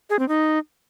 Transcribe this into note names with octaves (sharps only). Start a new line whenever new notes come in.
G#4
C4
D#4